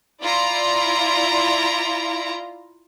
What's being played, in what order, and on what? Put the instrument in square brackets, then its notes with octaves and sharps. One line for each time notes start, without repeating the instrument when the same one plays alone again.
[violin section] E4 F4 D5 A#5